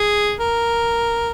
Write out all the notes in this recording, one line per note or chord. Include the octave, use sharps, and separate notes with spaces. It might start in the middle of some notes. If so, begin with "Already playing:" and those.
Already playing: G#4
A#4